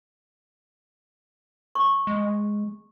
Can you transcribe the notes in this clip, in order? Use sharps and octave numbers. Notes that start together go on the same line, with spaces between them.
C#6
G#3